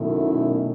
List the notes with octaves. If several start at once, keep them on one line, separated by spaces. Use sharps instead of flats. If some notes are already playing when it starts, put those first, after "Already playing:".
Already playing: F#2 B2 D#3 A3 E4